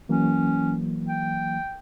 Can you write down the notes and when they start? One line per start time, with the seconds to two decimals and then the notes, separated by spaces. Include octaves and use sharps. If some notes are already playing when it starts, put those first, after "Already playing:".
0.09 E3 F#3 A#3 C#4
1.08 G5